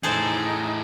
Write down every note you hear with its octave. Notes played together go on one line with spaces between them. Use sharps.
E2 A2 D#4 G#4 A4 C5